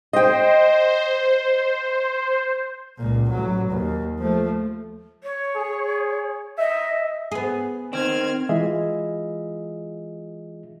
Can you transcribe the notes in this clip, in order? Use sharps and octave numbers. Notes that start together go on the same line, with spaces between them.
C5 D#5 G5
C#2 A#2
A1 F#3
D#2
F3 A3
C#5
G#4
D#5 E5
B3 G#4
D#3 C4 F6 G#6
E3 G#3 F4 G#4 D#5 E5